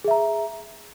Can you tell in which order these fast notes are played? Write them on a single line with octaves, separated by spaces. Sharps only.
G#4 E5 A#5